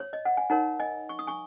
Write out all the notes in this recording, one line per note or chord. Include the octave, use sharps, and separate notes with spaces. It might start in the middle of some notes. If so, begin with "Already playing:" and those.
C#5
D#5
F#5
G#5
D#4 A#4 C#5 F#5 A#5
D#5 G#5
C#6
D#6
G#5 C#6